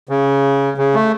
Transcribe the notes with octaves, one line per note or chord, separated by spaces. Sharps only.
C#3
C#3
A3